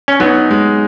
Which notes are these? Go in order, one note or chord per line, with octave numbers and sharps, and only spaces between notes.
C#4
F#3 B3 D#4
G#3